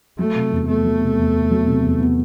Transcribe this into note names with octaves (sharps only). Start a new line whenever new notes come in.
F#3 A3
C3
E2
A3 B3
F#3
C3
E2
B3
F#3
C3
E2
B3